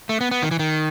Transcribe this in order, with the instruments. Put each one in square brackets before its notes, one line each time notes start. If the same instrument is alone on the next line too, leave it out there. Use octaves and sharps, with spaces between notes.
[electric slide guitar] A3
B3
B3
D#3
E3
D#3